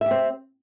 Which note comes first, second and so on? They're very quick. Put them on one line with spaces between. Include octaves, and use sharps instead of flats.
E5 G4 C4